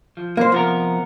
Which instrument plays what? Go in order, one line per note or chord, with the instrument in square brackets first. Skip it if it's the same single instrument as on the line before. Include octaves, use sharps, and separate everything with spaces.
[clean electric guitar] F3
[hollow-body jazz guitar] A#3 C5
[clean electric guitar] C3 B3 A#4 [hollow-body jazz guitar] F3